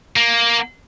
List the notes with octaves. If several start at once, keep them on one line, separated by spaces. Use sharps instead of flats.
A#3